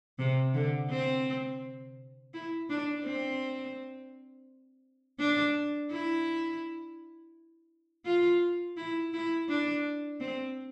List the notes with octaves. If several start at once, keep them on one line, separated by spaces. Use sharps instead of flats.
C3
D3
C4
E4
D4
C4
D4
E4
F4
E4
E4
D4
C4